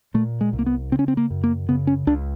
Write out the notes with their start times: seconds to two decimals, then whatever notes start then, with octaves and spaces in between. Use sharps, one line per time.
0.14 A#2 A3
0.41 G#3
0.53 C2
0.59 A#3
0.66 B3
0.92 C#3 C4
0.99 C#4
1.08 C4
1.17 A#3
1.30 F#2
1.44 A#3
1.69 C#3 B3
1.87 C#4
2.07 C#2 D4